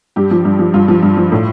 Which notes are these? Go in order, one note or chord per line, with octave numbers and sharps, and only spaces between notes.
G2 G4
F3
G2
F3
G2 F4
F3
G2
F3
A2